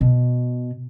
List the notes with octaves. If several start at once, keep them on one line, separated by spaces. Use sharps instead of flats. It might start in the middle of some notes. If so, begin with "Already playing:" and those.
B2